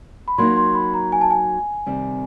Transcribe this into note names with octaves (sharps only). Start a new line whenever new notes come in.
B5
F#3 A#3 D#4 C6
C6
B5
A#5
G#5
A5
G#5
C3 D#3 G3 C4